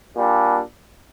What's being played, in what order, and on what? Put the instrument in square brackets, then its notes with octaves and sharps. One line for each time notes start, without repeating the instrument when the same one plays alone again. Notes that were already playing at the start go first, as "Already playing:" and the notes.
[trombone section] A#2 G3 D4